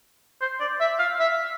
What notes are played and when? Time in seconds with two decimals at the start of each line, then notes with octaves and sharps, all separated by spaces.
0.41 C5
0.60 D5
0.80 E5
0.99 F5
1.19 E5